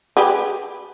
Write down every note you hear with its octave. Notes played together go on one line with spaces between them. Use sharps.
G4 G#4 B4